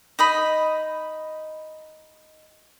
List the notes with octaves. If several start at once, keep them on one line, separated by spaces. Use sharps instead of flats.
D#4 D#5 B5